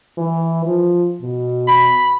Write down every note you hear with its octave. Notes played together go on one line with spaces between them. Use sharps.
E3
F3
B2
B5